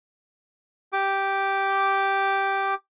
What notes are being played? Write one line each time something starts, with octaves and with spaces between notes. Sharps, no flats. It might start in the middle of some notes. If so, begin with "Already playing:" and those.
G4 D6